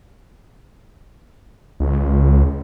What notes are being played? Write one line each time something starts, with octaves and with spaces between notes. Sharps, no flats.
C#2